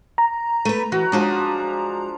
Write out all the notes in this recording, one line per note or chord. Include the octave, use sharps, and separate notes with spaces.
A#5
A3 B4
E3 F#4
F3 G#3 D4 F#4 G#4